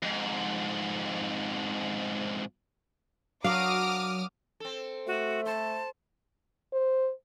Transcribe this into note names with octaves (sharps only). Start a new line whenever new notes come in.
F2 G#2
F#3 D4 F#4 A#4 F5 D6 D#6 F6
C4 A4
A3 F#4
C5 A5
C5